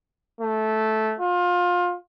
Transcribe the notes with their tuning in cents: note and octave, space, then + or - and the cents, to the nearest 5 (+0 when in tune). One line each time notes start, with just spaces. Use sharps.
A3 -10
F4 +25